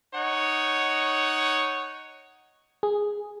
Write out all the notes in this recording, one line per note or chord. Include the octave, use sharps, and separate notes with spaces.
D#4 C#5 F#5
G#4